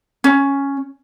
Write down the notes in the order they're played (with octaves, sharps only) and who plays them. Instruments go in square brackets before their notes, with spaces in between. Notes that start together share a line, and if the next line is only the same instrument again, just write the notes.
[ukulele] C#4